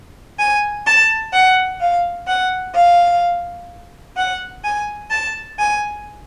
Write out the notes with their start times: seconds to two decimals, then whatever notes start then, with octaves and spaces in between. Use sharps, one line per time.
0.39 G#5
0.86 A5
1.33 F#5
1.80 F5
2.27 F#5
2.75 F5
4.16 F#5
4.64 G#5
5.10 A5
5.58 G#5